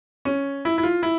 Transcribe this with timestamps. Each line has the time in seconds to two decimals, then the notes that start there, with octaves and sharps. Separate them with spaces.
0.25 C#4
0.65 E4
0.78 E4
0.83 F4
1.03 E4